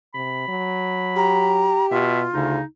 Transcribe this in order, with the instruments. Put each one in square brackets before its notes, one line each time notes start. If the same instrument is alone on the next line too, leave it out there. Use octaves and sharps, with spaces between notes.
[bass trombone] C3 [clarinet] B5
[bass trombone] F#3
[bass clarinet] G4 [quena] A#5
[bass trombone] B2 [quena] F4 [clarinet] E5
[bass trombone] D2 [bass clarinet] C#3 [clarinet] D#4